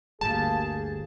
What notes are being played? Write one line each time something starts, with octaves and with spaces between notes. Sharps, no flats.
G1 D2 G3 A#3 G#4 A5